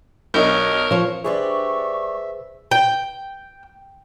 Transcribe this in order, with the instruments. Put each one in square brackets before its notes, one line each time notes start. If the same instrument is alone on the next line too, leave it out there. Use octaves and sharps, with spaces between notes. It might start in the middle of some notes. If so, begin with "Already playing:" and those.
[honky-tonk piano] B1 D4 D#5 [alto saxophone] A#4 [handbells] C#5 C#6 G6
[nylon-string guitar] F3 C#5
[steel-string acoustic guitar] G3 D4 G4 [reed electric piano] G#4 B4 C5 [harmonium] E5 [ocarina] C#6
[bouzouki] G5